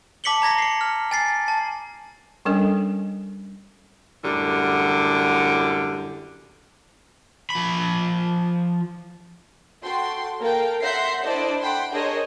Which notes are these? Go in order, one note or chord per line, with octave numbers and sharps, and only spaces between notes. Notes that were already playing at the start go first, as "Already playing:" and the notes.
A5 D6 B6 C#7 F#7 G7
A#5 G#6 A#6 B6
C7 C#7
F6
G#5 A6 C7
A5
G3 C#4 D4 A4 A#4 D#5
F#2 A2 D3 G3
F3 B5
F#4 A4 G5 C6
A#3 A4 A#4 F5 G5
E5 F#5 C6 G6 A#6 C7
D4 E4 A4 C5 D5 D#5
F#5 G5 B5 C6
D4 G#4 A#4 C5 C#5 D#5